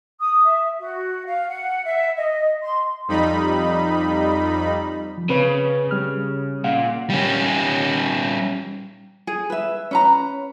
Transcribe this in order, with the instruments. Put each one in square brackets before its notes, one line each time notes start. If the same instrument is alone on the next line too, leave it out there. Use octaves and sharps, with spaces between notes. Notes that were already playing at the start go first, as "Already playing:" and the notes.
[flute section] D#6
E5
F#4
F5
F#5
E5
D#5
C6
[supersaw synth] F2 G3 D#4 B5
[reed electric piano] F3
[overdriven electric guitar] C#3 [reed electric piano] C4 B4 C#5
[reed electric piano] G3 F6
[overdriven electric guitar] A#2 [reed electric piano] F5 F#5
[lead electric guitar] G3 C#4
[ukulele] G#4
B4 E5
C#4 B4 A#5